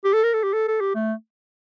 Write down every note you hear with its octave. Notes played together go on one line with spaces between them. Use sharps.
G4
A4
A#4
A4
G4
A4
A4
G4
A3